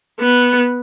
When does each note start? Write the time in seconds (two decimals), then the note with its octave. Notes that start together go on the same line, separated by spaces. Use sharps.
0.20 B3